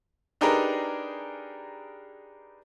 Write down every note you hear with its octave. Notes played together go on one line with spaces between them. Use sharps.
D4 D#4 G4 G#4 A#4 B4